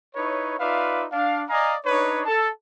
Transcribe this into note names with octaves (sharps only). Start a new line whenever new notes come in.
D#4 E4 B4 C#5
D#4 F4 B4 D5 E5 F5
D4 F5
D5 D#5 F5 G#5 A#5
D4 D#4 B4 C#5
A4 A5